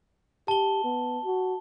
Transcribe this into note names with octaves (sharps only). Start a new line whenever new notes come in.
G4 A5 G7
B3
F#4